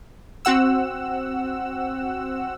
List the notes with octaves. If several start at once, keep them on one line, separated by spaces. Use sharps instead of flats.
C4 F#4 F#5 E6